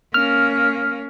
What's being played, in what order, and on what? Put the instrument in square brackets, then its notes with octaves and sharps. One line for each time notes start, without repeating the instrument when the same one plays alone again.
[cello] A#3 C#4 [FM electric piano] F6